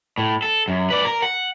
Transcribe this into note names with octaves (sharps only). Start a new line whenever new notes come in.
A2
A4
F#2
B4 D5
A#4
F#5